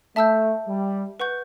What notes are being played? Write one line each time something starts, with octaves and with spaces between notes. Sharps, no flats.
A3 E5 A5 E6 G6
G3
B4 F#5 C#6 G6